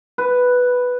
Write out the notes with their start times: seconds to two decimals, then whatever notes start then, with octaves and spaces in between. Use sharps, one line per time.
0.18 B4